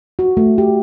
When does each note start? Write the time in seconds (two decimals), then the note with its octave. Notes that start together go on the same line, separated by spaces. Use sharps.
0.19 F#4
0.37 A3
0.58 G4